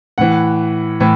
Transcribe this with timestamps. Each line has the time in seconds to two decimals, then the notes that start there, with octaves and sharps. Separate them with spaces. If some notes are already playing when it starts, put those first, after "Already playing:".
0.18 A2 E3 F#5
1.00 A2 E3